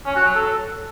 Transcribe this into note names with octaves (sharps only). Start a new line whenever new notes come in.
C#4
F#4
F#3
A4